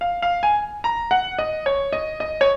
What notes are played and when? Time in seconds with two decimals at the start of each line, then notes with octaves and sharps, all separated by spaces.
0.01 F5
0.22 F5
0.43 G#5
0.84 A#5
1.11 F#5
1.39 D#5
1.66 C#5
1.93 D#5
2.20 D#5
2.41 C#5